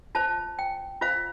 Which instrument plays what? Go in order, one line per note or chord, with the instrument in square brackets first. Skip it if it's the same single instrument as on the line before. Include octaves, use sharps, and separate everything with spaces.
[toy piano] F4 C5 A5
G5
F4 C5 F5